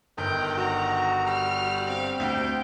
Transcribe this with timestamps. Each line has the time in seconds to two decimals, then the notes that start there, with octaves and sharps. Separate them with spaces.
0.18 G1 D#3 G5
0.57 F#4 A#5
1.27 G3 F6
1.88 C4 F5
2.20 D2 G5